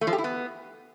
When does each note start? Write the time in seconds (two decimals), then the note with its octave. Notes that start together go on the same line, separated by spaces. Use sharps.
0.01 A3
0.07 F3
0.13 G4
0.18 E4
0.24 B3